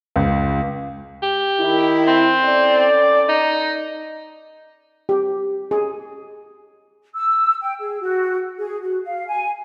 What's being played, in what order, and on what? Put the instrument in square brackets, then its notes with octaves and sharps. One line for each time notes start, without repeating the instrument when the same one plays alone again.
[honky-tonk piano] C#2
[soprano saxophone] G4
[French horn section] D#3 E4
[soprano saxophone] C4
[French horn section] C#4 A4 D5
[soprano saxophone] D#4
[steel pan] G4
G#4
[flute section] E6
G5
G#4
F#4
G#4
F#4
F5
G#5